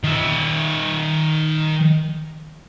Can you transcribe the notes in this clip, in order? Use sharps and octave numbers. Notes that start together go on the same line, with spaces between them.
D#3 E5